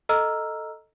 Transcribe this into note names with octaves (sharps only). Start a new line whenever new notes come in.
A4 D#5 A#5 E6 F6